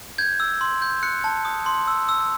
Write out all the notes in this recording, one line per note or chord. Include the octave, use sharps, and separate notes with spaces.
G6 G#6
E6
C6
G6
F#6 C#7
A5
D#6
C6
E6
E6